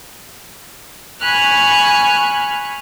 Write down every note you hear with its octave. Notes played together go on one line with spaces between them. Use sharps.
G#5 B5 C#6 F6 F#6